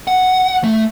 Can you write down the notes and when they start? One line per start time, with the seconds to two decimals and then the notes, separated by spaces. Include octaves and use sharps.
0.07 F#5
0.64 A3